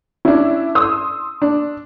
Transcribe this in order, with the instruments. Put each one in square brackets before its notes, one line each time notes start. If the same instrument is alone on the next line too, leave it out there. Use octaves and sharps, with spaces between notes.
[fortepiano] C#4 D4 [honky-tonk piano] E4
[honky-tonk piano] C6 D#6 E6
[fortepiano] D4